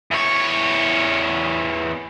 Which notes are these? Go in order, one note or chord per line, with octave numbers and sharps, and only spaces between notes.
E2 C#5